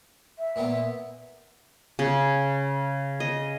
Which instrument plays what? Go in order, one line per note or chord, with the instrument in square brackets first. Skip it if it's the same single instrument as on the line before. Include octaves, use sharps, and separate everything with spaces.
[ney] E5
[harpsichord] A#2 A#3 B3
[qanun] C#3
D#5